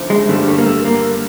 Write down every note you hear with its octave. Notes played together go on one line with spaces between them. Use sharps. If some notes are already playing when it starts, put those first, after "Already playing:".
Already playing: D#2 D3 F3 A3 C#4
G#3
G2 D3 G3 A3
A3
A#3
A3
A#3